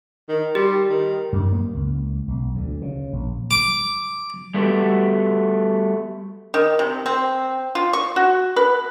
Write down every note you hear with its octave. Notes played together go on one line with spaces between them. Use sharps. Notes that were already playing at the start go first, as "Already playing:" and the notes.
D#3
G3 G4
D#3
F#2
A#3
C#2
B1
D2
C#3
A#1
D6
G3 A3 B3 F#4 G4 A4
D#3
C3
C4
F4
C#6
F#4
B4